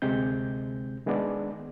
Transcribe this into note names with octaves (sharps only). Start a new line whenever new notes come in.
D2 C3 G#3 C4 G6
D#3 G#3 B3 D4 D5